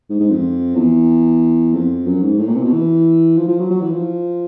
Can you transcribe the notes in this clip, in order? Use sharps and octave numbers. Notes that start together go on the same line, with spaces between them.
G#2
G#2
F2
E2
F2
F#2
G#2
A2
A#2
C3
B2
E3
F3
F3
F#3
F#3
E3
F3